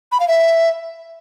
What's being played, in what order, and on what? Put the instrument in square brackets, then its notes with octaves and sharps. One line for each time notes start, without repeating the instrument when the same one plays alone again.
[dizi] B5
F5
E5